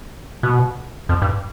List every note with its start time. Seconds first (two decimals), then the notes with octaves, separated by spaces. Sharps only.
0.43 B2
1.09 F2
1.22 G2